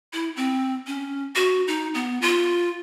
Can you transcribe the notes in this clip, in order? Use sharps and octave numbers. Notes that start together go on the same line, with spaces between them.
E4
C4
C#4
F#4
D#4
B3
F4